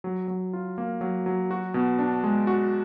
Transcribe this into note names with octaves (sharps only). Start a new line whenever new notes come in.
F#3
F#3
F4
A#3
F#3
F#3
F#4
B2
D4
G#3
F#4